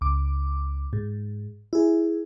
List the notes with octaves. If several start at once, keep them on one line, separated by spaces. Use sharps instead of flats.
C#2 D6
G#2
E4 G#4